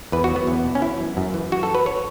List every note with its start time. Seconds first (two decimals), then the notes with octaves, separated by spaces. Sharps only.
0.12 E2 B4
0.24 F#4
0.30 F#3
0.36 B3
0.47 E2
0.64 B2
0.75 C#4
0.82 E3 E4
0.99 F#2
1.17 F#2
1.34 E3
1.52 F#2 F#4
1.63 A4
1.69 E3
1.75 B4
1.86 C#5